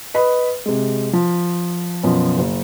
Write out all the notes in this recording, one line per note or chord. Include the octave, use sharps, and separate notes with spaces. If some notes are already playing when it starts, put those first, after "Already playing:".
B4 D#5 B5
C3 G#3
F3
F#2 B2 F3
F#1